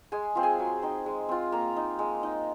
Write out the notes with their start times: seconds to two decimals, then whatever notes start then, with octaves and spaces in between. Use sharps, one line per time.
0.12 G#3 G#4 G#5
0.35 C4 F4
0.43 G#4 G#5
0.59 F#3
0.82 C4 D#4
1.06 G#3
1.29 C4 F4
1.52 A#3 A#4 A#5
1.76 D#4
1.99 G#3
2.23 D#4